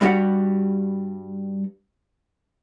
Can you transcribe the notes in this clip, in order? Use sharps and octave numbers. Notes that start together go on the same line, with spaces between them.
G2 G3 D4 F#4 G4 F#5